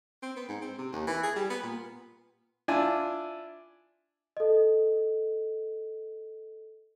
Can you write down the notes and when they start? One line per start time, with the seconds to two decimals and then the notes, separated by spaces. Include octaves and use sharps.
0.22 C4
0.36 B3
0.48 G#2
0.62 C4
0.78 C3
0.92 D#2
1.07 E3
1.23 G#4
1.36 G3
1.50 B3
1.63 A#2
2.68 D4 E4 F4 G#5
4.37 A4 D#5